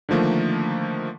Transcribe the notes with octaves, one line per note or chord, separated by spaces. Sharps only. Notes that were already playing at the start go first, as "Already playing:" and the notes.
D3 D#3 F3 A3 A#3